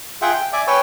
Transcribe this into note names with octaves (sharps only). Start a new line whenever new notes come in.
F4 G#4 E5 F#5 G5
G5
D5 E5 G#5 D6
B4 C#5 G5 G#5 C#6 E6